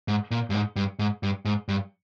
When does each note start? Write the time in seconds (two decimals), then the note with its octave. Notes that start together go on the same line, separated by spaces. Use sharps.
0.08 G#2
0.31 A#2
0.50 G2
0.54 G#2
0.76 G2
0.99 G#2
1.23 G2
1.45 G#2
1.69 G2